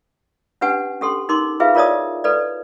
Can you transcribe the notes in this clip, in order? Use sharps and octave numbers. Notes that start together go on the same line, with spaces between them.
C#4 D4 G4 B4 F#5 G#5
C#4 G4 A4 C6
D#4 A#4 C6 D6
E4 F4 G#4 B4 E5 F5
F4 A#4 C#5 D5 A5 D#6
A4 B4 D5